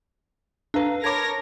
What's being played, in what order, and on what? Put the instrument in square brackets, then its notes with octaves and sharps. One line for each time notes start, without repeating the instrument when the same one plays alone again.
[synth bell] D4 B4 [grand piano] A4 F5 A#5
[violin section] A#4 C#5 A#6 [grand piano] A5 B5 D6 [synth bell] G#6